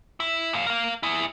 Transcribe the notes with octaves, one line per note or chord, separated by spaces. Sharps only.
E4
F#2 F5
A#4 F5
E4 G#4